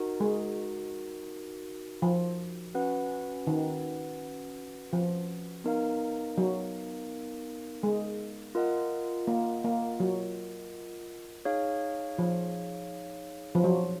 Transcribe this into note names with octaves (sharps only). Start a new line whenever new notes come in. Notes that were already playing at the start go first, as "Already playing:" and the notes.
Already playing: D#4 F#4 A#4
G#3
F3
C#4 F#4 B4 F#5
D#3
F3
B3 D#4 A#4 F5
F#3
G#3
F4 A#4 D#5 F#5
A#3
A#3
F#3
D#4 G#4 C#5 F5
F3
F3
F#3